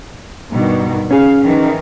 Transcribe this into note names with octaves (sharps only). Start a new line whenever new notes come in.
G2 B2 D#3
C#4 G#4 F5
D#3 E3 D#4